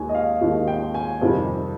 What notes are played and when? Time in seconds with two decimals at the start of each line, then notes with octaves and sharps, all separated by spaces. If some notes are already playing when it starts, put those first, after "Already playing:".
Already playing: D#2 D#3 G#3 G#5
0.09 D#5
0.15 F5
0.41 D#2 D#3 G#3 D#5
0.68 G5
0.94 G#5
1.21 F2 C3 D#3 G3